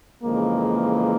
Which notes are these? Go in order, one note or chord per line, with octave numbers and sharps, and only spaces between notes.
F2 C#3 E3 G#3 A#3